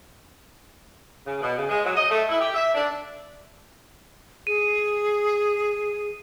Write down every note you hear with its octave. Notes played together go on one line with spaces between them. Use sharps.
C#3
B2
C#3
G#3
F#3
D#5
A3
E4
G4
E5
D4
G#4 D#7